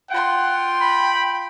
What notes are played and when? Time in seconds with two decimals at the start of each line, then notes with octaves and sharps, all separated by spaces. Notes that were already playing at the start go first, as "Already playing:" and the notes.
0.10 F4 F#5 G5 C6
0.81 B5